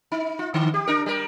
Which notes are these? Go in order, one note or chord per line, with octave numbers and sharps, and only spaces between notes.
D#4
F4
D3
G4
D4 A#4
G3 A#4